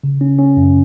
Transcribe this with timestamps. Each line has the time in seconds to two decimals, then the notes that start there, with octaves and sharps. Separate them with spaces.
0.04 C#3
0.21 C#4
0.38 C#4
0.57 F#2